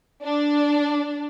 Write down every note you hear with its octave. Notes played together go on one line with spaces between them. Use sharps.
D4